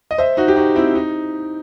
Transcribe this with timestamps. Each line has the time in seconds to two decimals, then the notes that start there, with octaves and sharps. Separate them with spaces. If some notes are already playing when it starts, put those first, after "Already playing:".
0.11 D#5
0.18 C5 E5
0.37 D#4 F#4
0.48 G4
0.56 D#4 F#4
0.76 C4 E4
0.95 D#4